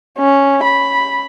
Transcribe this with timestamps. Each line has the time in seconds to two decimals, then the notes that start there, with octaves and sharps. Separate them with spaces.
0.19 C#4
0.64 B5